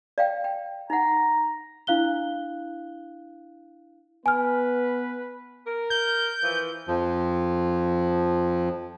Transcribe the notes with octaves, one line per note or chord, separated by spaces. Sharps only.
D5 F5 G5
G5
D#4 F#5 A#5
D4 E4 F5 F#6 G7
B3 B4 G#5 F6
A#4
G6
E3 F3
F2 F3